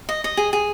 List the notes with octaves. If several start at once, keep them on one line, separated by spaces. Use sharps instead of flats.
D#5
D#5
G#4
G#4